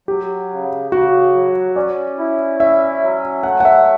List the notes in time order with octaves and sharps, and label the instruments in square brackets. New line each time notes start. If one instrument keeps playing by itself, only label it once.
[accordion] F#3 [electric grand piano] G4
[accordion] C#3
[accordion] C#3 [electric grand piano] F#4
[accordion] F#3
[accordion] C#4 [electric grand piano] D5
[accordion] E4
[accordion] C#4 [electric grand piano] E5
[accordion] F#3
[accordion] A3 [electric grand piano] F#5
[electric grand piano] F#5
E5